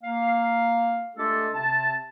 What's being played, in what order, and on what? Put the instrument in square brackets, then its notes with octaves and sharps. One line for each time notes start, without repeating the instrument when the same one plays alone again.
[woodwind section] A#3 F5
G#3 A3 D4 F4 G4 A4
C3 C4 A5